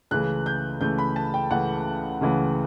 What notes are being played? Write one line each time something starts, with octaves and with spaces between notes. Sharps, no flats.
C#2 C#3 E3 A3 F#6
G6
C#2 C#3 E3 A3 G6
B5
A5
G5
C#2 C#3 E3 A3 F#5
C#2 C#3 E3 A3